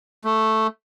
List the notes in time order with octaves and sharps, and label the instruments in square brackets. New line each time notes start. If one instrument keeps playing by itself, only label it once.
[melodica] A3